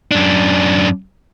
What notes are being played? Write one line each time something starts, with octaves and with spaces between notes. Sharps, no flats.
F#2 D4